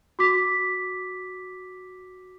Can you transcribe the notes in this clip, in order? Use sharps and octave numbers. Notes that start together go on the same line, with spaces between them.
F#4 D6 B6